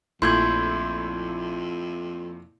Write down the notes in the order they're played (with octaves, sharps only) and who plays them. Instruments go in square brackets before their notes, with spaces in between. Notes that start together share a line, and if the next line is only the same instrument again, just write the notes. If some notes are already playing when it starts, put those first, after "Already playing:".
[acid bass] A#1 [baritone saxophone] F2 [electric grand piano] A#2 A3 E4 [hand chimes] C6 G6 G#6